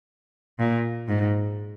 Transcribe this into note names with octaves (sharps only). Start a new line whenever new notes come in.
A#2
G#2